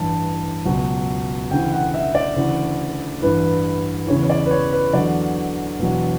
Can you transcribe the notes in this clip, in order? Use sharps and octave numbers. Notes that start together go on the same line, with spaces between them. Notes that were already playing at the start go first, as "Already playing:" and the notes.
Already playing: A1 G2 E3 A5
C#2 B2 F#3
D2 C#3 E3 G5
F#5
E5
D5
D2 C#3 E3
A1 G2 E3 B4
E2 C#3 E3 C#5
C#5
D5
B4
C#5
B4
E2 D3 F#3 D5
E1 E2 B2 F#3